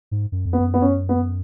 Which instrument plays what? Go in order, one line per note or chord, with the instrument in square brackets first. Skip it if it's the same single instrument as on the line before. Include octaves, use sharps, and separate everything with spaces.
[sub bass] G#2
F#2
F2
[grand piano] B3
[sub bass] F#2
[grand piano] B3
C#4
B3